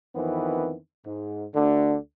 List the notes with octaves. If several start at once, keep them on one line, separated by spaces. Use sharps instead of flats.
F2 D#3 E3 B3 C4
G#2
D2 D3